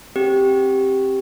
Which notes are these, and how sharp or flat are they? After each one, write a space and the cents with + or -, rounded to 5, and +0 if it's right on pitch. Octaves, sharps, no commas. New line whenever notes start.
C4 +25 G4 +0